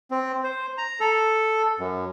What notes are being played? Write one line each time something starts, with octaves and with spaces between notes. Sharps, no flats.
C4
C5
A#5
A4
F#2